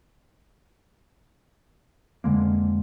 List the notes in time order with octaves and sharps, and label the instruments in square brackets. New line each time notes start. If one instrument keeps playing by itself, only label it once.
[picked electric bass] F2 D3 G#3 A#3